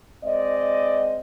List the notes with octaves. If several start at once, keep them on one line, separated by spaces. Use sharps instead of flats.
G#3 C4 D5 D#5